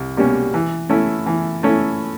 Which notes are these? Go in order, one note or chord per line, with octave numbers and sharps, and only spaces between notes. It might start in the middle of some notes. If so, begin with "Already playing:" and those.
Already playing: C2
B2 G3 A#3 C#4
E3
A3 C#4 E4
E3
A3 C#4 E4